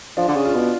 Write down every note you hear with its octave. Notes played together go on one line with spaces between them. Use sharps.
F3 D4
D3
C#3
F4
B2